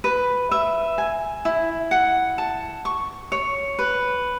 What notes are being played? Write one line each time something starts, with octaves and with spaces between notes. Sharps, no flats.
B4
E5
G#5
E4
F#5
A5
C#6
C#5
B4